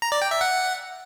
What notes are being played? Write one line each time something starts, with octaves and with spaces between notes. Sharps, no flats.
A#5
D5
G5
E5
F#5